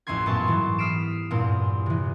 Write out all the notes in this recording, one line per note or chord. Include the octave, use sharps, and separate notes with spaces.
A1 F2 A3 C#4 C6 G#6
F#2 A#2 B3 A5 C6 C#6
G#2 E3 F#3 G3
D#6 F6 B6 C7 D7 E7
E2 G2 A#2 C4
C3 E3